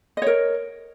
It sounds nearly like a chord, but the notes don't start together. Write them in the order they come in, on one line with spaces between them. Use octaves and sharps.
D#5 C#5 A#4